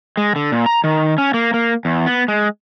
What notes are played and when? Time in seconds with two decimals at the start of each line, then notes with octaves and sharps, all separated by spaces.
0.17 G#3
0.36 D3
0.52 A#2
0.66 A#5
0.84 D#3
1.18 C#4
1.34 A#3
1.54 A#3
1.85 E2
2.06 B3
2.28 G#3